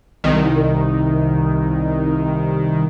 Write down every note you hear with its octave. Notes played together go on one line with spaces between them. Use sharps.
C2 D#3